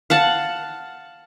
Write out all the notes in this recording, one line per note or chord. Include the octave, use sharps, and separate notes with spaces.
F5 F#5 A5